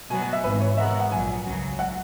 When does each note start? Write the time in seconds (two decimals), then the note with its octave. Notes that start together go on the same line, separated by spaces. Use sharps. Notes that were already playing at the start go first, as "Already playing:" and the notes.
0.10 B2 F#3 B3 F#4 G#5
0.22 G#5
0.33 E5
0.44 G#1 G#2 E3 B4
0.60 C#5
0.77 B2 G#3 B3 F#4 A#4 E5
1.00 F#5
1.12 A#1 A#2 F#3 G#5
1.45 C#2 C#3 F#3
1.79 F#5